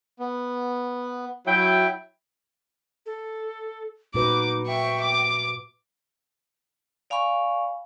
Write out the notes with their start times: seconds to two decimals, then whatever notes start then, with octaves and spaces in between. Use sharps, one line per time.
0.20 B3
1.47 F#3 E4 E5 G5
3.06 A4
4.15 A#2 D#4 F#4 B4 D6
4.67 E5 G5 C#6
5.01 D6
7.10 D5 F5 G#5 B5 C#6